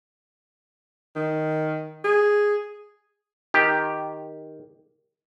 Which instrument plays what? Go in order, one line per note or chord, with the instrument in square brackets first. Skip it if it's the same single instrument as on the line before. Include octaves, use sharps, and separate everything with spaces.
[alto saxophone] D#3
G#4
[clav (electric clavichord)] D#3 G4